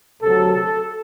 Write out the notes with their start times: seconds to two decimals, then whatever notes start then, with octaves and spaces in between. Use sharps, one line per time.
0.21 D2 C3 F#3 A4
0.53 A4